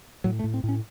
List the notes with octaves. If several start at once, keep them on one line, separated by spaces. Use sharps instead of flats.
A2 F#3
A3
A2
C4
A2
C#4